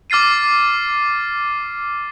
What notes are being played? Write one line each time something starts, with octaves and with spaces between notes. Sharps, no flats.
D6 F6 A6 C7 D#7